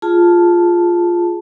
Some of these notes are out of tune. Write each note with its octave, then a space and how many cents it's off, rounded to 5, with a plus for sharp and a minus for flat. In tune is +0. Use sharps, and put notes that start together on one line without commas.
F4 +0 G#4 +0 A5 +0